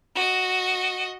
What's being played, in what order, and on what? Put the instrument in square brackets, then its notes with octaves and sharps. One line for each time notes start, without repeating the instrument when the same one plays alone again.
[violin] F#4 D#5